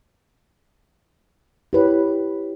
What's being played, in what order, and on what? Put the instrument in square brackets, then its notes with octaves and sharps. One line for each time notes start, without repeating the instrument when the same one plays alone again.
[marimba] E4 C#5 [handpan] G4 B4